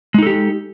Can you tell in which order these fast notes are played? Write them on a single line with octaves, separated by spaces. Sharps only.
G#3 D#4 A4 G4